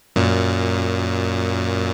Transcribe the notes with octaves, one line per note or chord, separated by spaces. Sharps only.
F#2 A#2